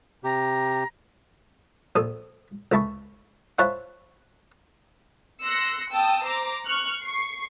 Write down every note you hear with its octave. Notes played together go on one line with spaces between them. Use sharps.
C3 G4 A#5
A#1 A4 D#6
C#2 E4 A5 C#6
E4 F4 C5 C#5 F#5 A5
C6 E6 F#6 A#6 C#7
G5 A5 D#6 E6
C5 A#5 D6
C#6 F6 F#6 C#7
C#6 C7